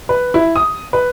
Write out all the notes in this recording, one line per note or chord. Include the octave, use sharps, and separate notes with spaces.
B4
E4
D#6
B4